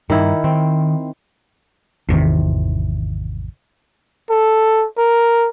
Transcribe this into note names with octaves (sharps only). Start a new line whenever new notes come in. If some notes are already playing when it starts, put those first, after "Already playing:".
G2 D#3 E4
D#3 C4
G#1 E2 C3 D#3
A4
A#4